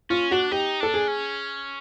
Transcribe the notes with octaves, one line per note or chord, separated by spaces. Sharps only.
C#4 F4
D4 F#4
D#4 G4
D4 A4
G#4
C#4